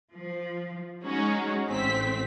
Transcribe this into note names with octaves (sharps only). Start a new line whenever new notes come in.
F3
G#3 C#4 D#4 F#4
A1 C4 B6